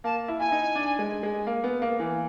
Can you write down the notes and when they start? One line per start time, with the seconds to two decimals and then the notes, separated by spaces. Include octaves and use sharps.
0.04 A#3 A5
0.28 E4
0.40 E4 G#5
0.52 D#4
0.75 D4
0.99 G#3
1.23 G#3
1.47 A#3
1.64 B3
1.82 A#3
2.00 E3